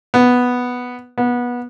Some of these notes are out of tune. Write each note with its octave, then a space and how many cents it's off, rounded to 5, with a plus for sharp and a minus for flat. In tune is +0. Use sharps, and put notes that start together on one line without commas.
B3 +0
B3 -20